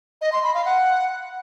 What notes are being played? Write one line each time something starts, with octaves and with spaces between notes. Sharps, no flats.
D#5
C6
B5
F5
F#5